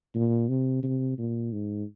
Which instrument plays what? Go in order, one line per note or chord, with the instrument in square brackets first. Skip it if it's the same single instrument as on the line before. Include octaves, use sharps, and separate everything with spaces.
[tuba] A#2
C3
C3
A#2
G#2